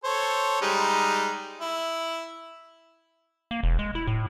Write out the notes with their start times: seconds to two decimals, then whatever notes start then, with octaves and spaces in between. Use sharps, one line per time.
0.04 A4 C5 C#5
0.61 G3 G#3 D#4
1.61 E4
3.51 A#3
3.63 E1
3.79 G#3
3.95 E4
4.07 A2